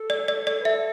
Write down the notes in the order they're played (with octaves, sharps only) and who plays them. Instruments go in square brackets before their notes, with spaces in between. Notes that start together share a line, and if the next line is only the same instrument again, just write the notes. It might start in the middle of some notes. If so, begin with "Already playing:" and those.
Already playing: [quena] A4
[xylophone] D5
D5
D5
[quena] B4
[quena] A4 [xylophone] E5